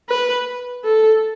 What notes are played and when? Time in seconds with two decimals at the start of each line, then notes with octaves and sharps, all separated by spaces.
0.09 B4
0.84 A4